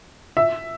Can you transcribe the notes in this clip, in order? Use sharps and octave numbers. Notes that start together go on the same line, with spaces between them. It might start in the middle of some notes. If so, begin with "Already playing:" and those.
E5